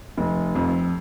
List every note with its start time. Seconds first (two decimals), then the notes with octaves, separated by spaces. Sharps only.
0.17 F1
0.55 F2